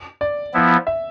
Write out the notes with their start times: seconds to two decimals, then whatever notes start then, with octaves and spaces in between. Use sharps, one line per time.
0.21 D5
0.54 F3 B3 E4
0.87 E5